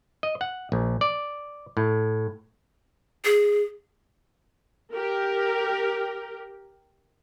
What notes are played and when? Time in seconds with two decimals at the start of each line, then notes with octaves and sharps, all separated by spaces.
0.23 D#5
0.41 F#5
0.72 A#1
1.01 D5
1.77 A2
3.25 G#4
4.94 G4 A#4